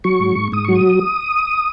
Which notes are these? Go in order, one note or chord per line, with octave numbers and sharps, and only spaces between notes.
F#3 C#6
G#2
G#2
G#2 D#6
F#3 C#6
D#6